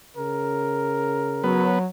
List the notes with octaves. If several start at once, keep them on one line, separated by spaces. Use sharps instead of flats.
C#3 A#4
F#3 B3